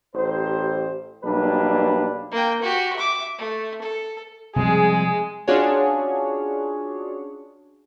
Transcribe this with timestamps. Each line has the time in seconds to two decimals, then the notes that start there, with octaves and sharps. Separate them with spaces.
0.15 A1 G4 C5
1.24 B1 G3 A#3 D4 B4
2.32 A#3 G5
2.62 F#4 G4
2.96 E5 D6
3.38 A3
3.82 A4
4.56 C3 F3 G3 G#3 G#4
5.48 C#4 D4 F4 F#4 G#4 C#5